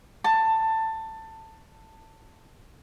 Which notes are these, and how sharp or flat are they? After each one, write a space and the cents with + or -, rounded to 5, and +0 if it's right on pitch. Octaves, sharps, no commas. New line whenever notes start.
A5 +15